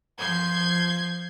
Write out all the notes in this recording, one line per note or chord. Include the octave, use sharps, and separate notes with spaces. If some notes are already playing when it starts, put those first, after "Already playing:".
F3 G6 G#6 C7